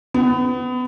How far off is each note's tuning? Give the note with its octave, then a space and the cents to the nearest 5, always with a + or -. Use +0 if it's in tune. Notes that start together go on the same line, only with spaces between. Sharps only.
B3 +30